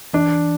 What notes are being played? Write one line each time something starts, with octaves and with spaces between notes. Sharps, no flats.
E3 D4